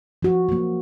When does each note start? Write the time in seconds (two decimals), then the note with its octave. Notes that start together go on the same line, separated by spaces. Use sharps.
0.22 F3 F#4
0.49 F#3 A#3